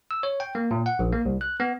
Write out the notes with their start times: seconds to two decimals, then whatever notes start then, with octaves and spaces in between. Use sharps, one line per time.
0.11 E6
0.23 C#5
0.40 G5
0.55 A#3
0.71 A#2
0.86 F#5
0.99 A#1
1.12 A#3
1.25 C2
1.41 F#6
1.60 B3